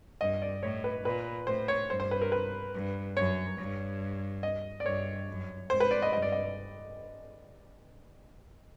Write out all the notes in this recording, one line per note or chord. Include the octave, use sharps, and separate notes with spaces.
G2 D#5
D5
A2 C#5
B4
A#2 B4
A2 C5
C#5
G2 C5
C5
B4
A#4
B4
G2
F#2 C#5
G2
D#5
D5
G2 C#5
F#2
G#2 C5
B4
D5
D#5
G2 D#5
D5
D#5